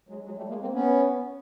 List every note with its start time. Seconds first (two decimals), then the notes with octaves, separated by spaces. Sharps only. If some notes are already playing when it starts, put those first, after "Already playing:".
0.09 F#3 G#3
0.25 F#3 G#3
0.37 G3 A3
0.49 G#3 A#3
0.61 A#3 C4
0.72 B3 C#4